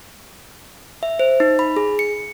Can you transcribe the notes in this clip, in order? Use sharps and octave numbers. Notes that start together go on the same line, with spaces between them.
E5
C5
D#4
B5
G#4
C#7